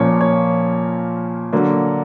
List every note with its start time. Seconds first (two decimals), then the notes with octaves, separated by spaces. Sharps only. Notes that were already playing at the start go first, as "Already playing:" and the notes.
Already playing: A#2 F3 A#3 C#4 C#5
0.21 C#5
1.53 D3 F#3 A#3